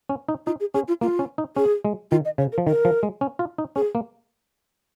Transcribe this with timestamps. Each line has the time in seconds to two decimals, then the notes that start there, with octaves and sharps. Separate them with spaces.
0.09 C#4
0.29 D#4
0.46 D#4 F4
0.60 G#4
0.74 C#4 G#4
0.88 F4
1.01 A#3 F4
1.19 C#4
1.38 D#4
1.56 C#4 G#4
1.84 G#3
2.11 D#3 F4
2.25 D#5
2.38 C#3 C#5
2.52 A#4
2.58 F3
2.67 D#3 A#4
2.85 F3
3.03 G#3
3.21 C#4
3.39 F4
3.58 D#4
3.76 C#4 G#4
3.95 A#3